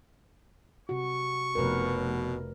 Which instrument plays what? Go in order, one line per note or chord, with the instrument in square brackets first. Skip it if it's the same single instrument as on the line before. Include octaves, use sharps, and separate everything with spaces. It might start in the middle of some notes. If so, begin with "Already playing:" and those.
[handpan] C3 F#4 [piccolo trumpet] C#6
[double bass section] F1 [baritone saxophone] B2 [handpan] A#4 B4